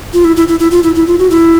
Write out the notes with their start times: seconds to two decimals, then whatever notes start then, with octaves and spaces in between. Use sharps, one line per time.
0.14 F4
0.24 E4
0.36 E4
0.48 E4
0.60 E4
0.71 F4
0.83 E4
0.95 E4
1.07 F4
1.19 F#4
1.30 E4